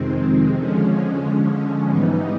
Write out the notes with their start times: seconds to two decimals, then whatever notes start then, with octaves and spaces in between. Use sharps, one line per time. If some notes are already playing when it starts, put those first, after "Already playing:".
Already playing: F2 C3 D#3 G#3 C4
0.57 D3 F3 G#3 C#4
1.88 G#2 E3 G3 B3 D#4